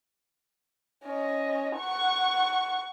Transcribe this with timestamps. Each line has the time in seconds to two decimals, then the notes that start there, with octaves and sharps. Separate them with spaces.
1.04 C#4 D#5
1.77 F#5 C#6